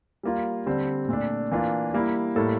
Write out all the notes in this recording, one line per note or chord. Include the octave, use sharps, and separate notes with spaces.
G3 A#3 F4
D3 G3 C4
A#2 A3 D4
E3 A#3 D4 F4
G3 A#3 E4
A2 G3 A#3 E4 A4